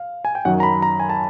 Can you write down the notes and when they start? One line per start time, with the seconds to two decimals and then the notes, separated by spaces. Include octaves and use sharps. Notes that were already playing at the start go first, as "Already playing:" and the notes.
Already playing: F5
0.25 G#5
0.35 G5
0.45 F#2 D#3 F#3 F#5
0.60 A#5
0.63 B5
0.82 A#5
1.00 G#5
1.10 A5